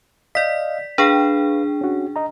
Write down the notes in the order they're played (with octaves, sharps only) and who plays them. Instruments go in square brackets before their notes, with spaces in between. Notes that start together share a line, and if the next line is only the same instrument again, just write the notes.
[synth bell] D5 B6 [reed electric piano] D#5 F5
[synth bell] D4 G#4 G5 [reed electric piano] B4 F5
[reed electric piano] C#4 F#4
D#5 A#5